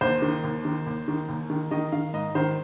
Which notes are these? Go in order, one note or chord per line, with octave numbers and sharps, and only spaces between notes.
D#2 C5
D#3
D#2
D#3
D#2
D#3
D#2
D#3
D#3 D#5
D#3 F5
G#2 D#5
D#3 C5